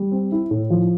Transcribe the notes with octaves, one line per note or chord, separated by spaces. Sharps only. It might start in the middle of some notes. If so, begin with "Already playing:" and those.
Already playing: G3
C4
E4
A2
F3